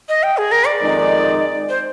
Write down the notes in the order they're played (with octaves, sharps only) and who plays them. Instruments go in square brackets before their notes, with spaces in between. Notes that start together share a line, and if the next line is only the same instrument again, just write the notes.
[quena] D#5
G5
G#4
A#4
D5
[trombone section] F2 D#3 G#3 D#4
[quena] C5